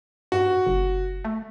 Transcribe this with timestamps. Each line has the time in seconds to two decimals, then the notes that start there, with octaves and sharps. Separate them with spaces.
0.32 G2 F#4
0.66 F#1
1.25 A3